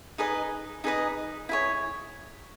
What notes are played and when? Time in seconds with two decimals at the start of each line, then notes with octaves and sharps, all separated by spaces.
0.18 D#4 G#4 B4 D#5
0.84 D#4 G#4 B4 D#5
1.49 E4 G#4 C#5